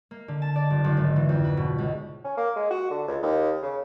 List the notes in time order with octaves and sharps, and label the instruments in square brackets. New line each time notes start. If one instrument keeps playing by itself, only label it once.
[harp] A#3
D3
A5
D5
F#1
F#1
G#1
E3
F2
B4
B2
C#2
[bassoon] C#4
A#3
G#3
F#4
D3
C#2
D#2
C#3